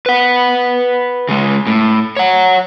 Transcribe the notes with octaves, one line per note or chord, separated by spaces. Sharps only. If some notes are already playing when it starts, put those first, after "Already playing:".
B4 F#5
C#3 G#3
A2
C#5 F#5